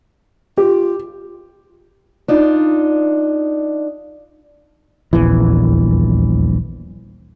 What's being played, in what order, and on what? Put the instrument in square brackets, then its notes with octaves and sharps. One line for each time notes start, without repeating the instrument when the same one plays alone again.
[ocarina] F4 [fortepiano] G4
[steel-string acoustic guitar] D4 D#4 F4
[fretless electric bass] D#1 A#1 E2 E3